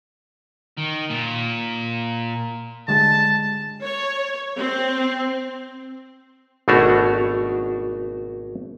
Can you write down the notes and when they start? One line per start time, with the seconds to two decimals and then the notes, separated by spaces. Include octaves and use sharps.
0.78 D#3
1.10 A#2
2.88 D3 G#3 A5
3.83 C#5
4.58 C4
6.68 G#1 B2 A3 D4 F#4 C#5